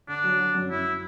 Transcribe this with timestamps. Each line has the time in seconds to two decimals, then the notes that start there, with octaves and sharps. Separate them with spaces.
0.08 D3 D4
0.24 F#3
0.40 F#3
0.55 F#2
0.71 F#2 E4